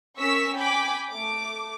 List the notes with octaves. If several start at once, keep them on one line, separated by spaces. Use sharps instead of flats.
C#4 A#4 C#6 E6 B6
G5 G#5 B5 D6
A3 D6